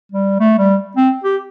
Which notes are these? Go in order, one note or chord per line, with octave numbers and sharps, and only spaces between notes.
G3
A3
G3
C4
G4